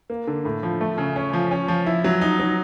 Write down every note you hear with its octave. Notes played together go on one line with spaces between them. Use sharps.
A#3
D3
A2
F3
A3
C#3
C#4
F3
C#4
F3
E4
F#3
D#4
F#3